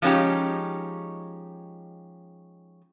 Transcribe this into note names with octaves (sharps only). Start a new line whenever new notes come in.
F3 G#3 C#4 D#4 G4